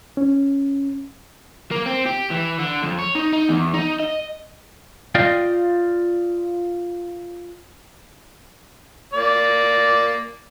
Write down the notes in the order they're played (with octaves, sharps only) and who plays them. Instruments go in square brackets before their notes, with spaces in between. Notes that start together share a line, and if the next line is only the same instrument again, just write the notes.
[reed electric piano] C#4
[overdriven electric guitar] A#3
C4
G4
E3
D3
F2
C#5
D#4
D#4
E2
D#4
D#5
[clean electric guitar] F4 D5 D#5 F5 G5
[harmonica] A#3 D5